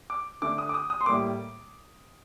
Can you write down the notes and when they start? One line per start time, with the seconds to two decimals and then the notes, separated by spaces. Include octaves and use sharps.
0.10 D6
0.42 D3 A3 D6
0.58 D#6
0.69 D6
0.74 D#6
0.90 D#6
1.01 C6
1.06 A2 G3 A#3 D6